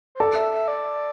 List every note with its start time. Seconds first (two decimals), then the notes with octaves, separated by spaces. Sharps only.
0.15 C5
0.20 A4 D5
0.35 E5
0.52 E5
0.68 D5